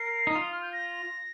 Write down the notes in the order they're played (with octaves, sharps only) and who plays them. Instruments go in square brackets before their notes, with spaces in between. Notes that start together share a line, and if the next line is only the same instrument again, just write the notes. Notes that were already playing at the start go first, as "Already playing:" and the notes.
Already playing: [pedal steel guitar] A#4 [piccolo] C7
[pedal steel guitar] D#4
F4
[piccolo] D#6
F6
G6
A#6